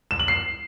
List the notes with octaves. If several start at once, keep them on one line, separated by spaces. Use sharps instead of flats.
E7
F#7
C7